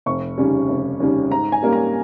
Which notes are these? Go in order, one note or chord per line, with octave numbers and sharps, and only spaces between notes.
F1 C#6
D#2 C#3 G3 C#4
F1
D#2 C#3 G3 C#4
G#2 A#5
G#5
G3 A#3 C#4
A#5